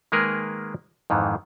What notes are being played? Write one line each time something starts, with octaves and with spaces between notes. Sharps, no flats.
D#3 G#3 A#3 G#4 A#4 B4
F2 G#2 D#3 E3